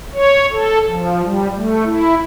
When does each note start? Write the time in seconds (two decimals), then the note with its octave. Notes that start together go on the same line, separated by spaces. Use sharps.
0.13 C#5
0.50 A4
0.87 F3
1.24 G3
1.55 A3
1.85 E4